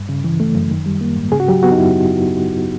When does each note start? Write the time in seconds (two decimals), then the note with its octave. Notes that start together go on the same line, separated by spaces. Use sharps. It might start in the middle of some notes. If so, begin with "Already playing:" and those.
Already playing: G2
0.09 C#3
0.24 E3
0.40 A3
0.55 F#2
0.71 D#3
0.86 G3
1.01 A#3
1.16 G#2
1.32 C#3 G#4
1.40 F#4
1.48 F#3 G4
1.63 B3 F#4
1.72 D#4
1.78 F#2 E4